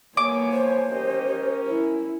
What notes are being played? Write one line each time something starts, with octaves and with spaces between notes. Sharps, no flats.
F3 A#3 B3 C#5 G#5 D6
C5
C#4 G4 A#4 D#5
E4